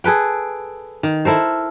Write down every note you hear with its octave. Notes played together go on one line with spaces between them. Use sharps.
G#4 A4 B4 G5
D#3
E4 A4 A#4 C5